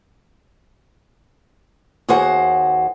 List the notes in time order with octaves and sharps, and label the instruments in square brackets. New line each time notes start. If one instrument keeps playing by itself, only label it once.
[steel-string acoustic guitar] D#2 F#4 G#4 C5 F#5